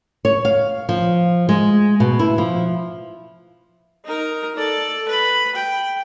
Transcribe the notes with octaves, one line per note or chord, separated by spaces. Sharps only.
C#5
F5
F3
G#3
B2
E4
F3
D#4 A#4
A4 D5
B4 B5
G5